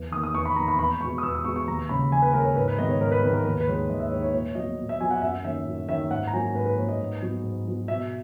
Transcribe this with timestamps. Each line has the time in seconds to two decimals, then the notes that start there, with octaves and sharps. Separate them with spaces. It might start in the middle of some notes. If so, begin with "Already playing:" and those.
Already playing: E2
0.11 D#3 D#6
0.16 A#3
0.23 D#6
0.34 E2 C#6
0.46 B5
0.56 A#3 A#5
0.59 D#3
0.68 B5
0.78 E2 B5
1.01 B2 G#3 C#6
1.18 D#6
1.23 E2 E6
1.35 D#6
1.45 B2 G#3 C#6
1.56 C#6
1.68 D#2 A#5
1.89 C#3 G#3 C#4 B5
2.11 D#2 G#5
2.22 B4
2.33 C#3 G#3 C#4 A#4
2.45 C#5
2.56 G#2 B4
2.68 B4
2.78 D#3 G#3 B3 D#5
2.89 C#5
3.00 G#2 A#4
3.12 B4
3.23 D#3 G#3 B3 B4
3.34 A#4
3.44 D#2 B4
3.60 B4
3.67 D#3 G#3 C#5
3.89 D#2 D#5
4.00 E5
4.11 D#3 G#3 C#5
4.22 C#5
4.33 A#2 C#5
4.55 F#3 D#5
4.60 B3
4.78 A#2
4.89 E5
5.00 F#3 B3 G#5
5.11 F#5
5.22 F#2 E5
5.44 D#3 A#3 C#4 E5
5.67 F#2
5.88 D#3 A#3 C#4 E5
6.10 G#2 F#5
6.27 A#5
6.33 F#3 A#3 C#4 G#5
6.55 G#2 B4
6.66 B4
6.78 F#3 A#3 C#4 C#5
6.89 D#5
7.00 G#2
7.22 F#3 B3
7.44 G#2
7.66 F#3 B3
7.88 B2 E5